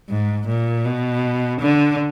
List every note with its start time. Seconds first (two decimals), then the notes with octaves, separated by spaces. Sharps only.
0.09 G#2
0.47 A#2
0.85 B2
1.61 D3